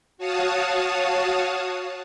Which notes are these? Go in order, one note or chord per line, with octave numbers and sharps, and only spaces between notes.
F#4 C#5 F5 A5 D#6